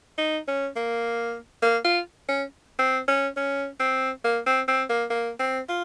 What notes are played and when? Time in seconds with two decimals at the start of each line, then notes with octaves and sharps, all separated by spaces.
0.18 D#4
0.48 C#4
0.76 A#3
1.62 A#3
1.85 F4
2.29 C#4
2.79 C4
3.08 C#4
3.37 C#4
3.80 C4
4.24 A#3
4.46 C4
4.68 C4
4.90 A#3
5.10 A#3
5.39 C4
5.69 F4